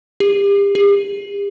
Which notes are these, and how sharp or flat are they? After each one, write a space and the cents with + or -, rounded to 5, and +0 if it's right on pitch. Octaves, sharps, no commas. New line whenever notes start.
G4 +35
G4 +45